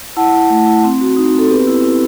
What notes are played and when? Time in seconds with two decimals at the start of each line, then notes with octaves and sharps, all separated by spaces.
0.17 E4 F#5 A5
0.34 E4
0.50 A3
0.67 E4
0.84 C4
1.01 F#4
1.17 D#4
1.34 C4 A4
1.50 B3 G4 B4
1.67 E4
1.84 E4